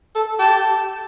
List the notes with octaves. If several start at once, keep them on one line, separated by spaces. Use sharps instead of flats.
A4
G4 A5